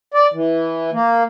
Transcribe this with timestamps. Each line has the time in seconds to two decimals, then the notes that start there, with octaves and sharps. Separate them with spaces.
0.14 D5
0.34 E3
0.93 A#3